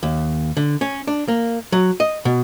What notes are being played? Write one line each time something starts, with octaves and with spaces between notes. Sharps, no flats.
D#2
D3
C#4
D4
A#3
F#3
D#5
B2